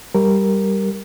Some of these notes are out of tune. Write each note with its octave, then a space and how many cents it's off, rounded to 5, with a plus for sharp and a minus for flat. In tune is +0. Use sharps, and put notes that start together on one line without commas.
G3 +0 G4 +0 A#4 +0